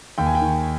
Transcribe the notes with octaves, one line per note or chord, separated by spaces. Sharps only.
D#2 G5
G#5
G5
D#3